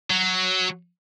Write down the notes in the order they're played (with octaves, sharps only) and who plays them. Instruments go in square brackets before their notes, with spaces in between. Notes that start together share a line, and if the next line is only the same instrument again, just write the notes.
[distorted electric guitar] F#3